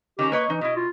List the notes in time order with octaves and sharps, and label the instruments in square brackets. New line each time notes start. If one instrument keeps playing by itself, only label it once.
[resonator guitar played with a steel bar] D#3 C#4 A#5 [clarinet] G4
[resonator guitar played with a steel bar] A#3 C#5 D#5 [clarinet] B4
[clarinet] E3 [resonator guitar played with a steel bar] D#4
[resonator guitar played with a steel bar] B2 E4 [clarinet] D#5
[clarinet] F4